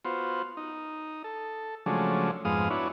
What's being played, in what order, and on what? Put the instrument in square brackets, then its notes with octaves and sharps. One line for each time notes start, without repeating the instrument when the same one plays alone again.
[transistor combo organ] B3 F4 F#4 C5
D#4
A4
C#3 F3 F#3 G#3 A3 D4
F2 G#2 G#3 B3 F5 D#6
B3 D4 E4 F#4 C#5